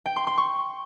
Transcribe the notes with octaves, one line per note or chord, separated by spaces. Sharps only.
G5
C6
C6
C#6